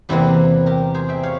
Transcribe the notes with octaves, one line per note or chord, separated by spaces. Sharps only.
E2 C3 E3 A#3 E4 G4
G4 A#4
G#4 C5
E5 G5
C#5 F5